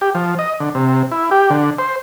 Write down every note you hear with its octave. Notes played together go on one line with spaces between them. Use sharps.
G4
F3
D#5
D3
C3
E4
G4
D3
C5